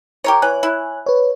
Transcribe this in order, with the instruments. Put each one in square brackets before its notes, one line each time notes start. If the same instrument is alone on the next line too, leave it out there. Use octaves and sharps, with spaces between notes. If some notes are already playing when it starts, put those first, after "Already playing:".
[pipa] G4 A#4 C#5
[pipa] E3 [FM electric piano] C#5 G#5 F#6
[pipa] E4
[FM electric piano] B4 C#5